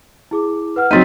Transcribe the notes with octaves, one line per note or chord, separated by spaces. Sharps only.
E4 G#4 D6
B4 F#5 F6
F#3 C4 D#4 A6 B6 D#7